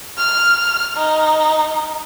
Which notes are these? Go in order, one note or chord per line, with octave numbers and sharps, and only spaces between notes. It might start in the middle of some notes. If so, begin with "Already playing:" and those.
F6
D#4